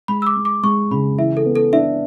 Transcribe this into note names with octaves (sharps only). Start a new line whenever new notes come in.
G#3 B5
E6
D6
G#3
D6
G#3 C#6
C#3 B5
E3 E5
A4
B3
A4
D4 E5